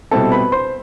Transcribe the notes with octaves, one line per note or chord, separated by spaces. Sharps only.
B2 G3 C4 E4 A4 A5
B4 B5
C5 C6